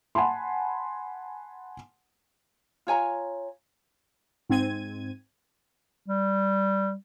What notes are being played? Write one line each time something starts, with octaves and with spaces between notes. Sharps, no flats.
F#5 G#5 A5 B5 C6
F4 C#5 G#5 A#5
G#2 C4 G#6 D#7
G3